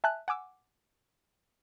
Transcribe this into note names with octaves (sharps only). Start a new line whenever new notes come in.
E5 G#5 A5 F#6
F#5 G#5 D6 E6